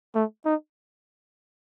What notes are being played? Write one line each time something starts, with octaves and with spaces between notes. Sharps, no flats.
A3
D#4